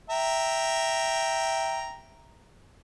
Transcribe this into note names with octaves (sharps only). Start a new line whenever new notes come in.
E5 G5 A#5